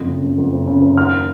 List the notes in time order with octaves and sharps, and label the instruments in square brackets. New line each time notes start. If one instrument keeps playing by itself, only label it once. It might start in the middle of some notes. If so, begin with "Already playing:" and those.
Already playing: [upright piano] F#1 F2
C#3
F#1
F2
F#1
C#3
F#1
D#2 F6